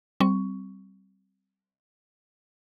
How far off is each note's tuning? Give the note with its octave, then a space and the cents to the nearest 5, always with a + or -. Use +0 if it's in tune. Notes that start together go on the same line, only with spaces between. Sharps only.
G3 -20 C4 +0 C#6 +10